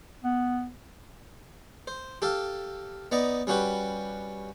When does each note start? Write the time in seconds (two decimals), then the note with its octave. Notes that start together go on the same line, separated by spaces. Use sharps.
0.24 B3
1.87 C5
2.22 G4 A4 F5
3.12 B3 D#4 D5 A#5
3.47 G3 C#4 F#4 G4 B4